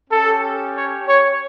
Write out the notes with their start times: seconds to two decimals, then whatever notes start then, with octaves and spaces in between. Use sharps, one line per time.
0.10 C#4 G4 A4
0.75 C#5
1.08 C#5